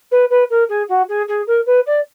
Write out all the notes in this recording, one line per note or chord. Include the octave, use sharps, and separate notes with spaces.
B4
B4
A#4
G#4
F#4
G#4
G#4
A#4
B4
D5